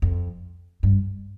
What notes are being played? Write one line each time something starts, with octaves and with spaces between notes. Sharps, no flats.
F2
G2